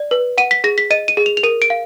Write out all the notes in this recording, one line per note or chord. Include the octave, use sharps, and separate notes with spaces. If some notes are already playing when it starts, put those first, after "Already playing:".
Already playing: D5
B4
F#5 D#7
B6
G#4 A#6
B6
D#5 D#7
D#7
G#4
F7
F7
A#4 D#7
D7
F5